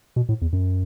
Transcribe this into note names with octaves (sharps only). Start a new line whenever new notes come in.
B2
A2
E2
F#2